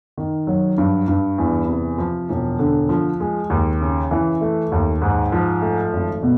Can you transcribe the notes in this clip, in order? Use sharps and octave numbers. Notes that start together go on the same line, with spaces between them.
D#3
F#3
G2
G2
E2
C3
F3
E1
D3
F3
G#3
D#2
C#3
E3
A3
D#2
G#2
F3
A3
G#1
B2